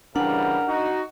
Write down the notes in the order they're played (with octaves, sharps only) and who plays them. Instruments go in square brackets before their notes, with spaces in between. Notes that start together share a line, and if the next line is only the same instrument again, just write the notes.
[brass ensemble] C#3 E3 G3 [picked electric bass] D4 [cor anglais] A#4 [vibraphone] F#5
[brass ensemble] D#4 F#4